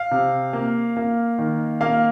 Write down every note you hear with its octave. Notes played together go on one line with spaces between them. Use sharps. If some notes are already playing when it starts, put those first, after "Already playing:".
Already playing: F5
C3
A#3
A#3
D#3
A#3 F5